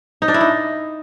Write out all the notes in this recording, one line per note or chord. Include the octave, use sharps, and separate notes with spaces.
D#4
D4
E4
D#4